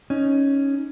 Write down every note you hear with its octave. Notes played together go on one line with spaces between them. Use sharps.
C#4 D#4